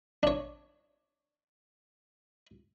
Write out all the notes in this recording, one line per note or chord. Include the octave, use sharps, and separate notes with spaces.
D4 C#5